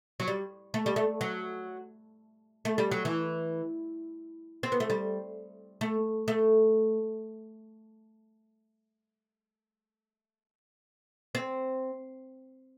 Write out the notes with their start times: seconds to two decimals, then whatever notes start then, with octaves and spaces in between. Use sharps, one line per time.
0.20 F#3
0.28 G3
0.74 A3
0.86 G3
0.96 A3
1.21 F#3
2.65 A3
2.78 G3
2.91 F#3
3.05 E3
4.63 C4
4.72 B3
4.80 A3
4.90 G3
5.81 A3
6.28 A3
11.35 C4